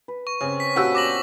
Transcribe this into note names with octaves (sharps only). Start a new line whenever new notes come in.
B4
C#6
C#3 C4 C#4 G4
B6
A#2 F3 B3 F#4 G4 E6
D5 B5 D6 A#6 F#7